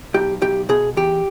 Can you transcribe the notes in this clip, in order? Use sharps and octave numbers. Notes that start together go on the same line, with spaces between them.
B1 G4
B1 G4
B2 G#4
E2 G4